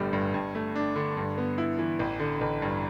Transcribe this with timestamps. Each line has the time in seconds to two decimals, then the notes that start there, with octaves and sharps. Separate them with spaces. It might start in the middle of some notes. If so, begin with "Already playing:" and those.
Already playing: G1 A2 D3 G3
0.13 G2
0.34 G2
0.55 A3
0.76 D4
0.96 D3
1.17 G2
1.38 B3
1.58 E4
1.79 E3
1.99 A1
2.20 D3
2.41 A1
2.62 G2